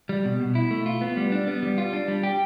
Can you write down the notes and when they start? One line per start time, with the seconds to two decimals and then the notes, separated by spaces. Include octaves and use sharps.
0.09 G3
0.25 B2
0.40 B2
0.55 E4
0.71 A3
0.86 F4
1.01 B3
1.17 G3
1.32 D4
1.47 B3
1.63 G3
1.78 F4
1.93 D4
2.08 G3
2.23 G4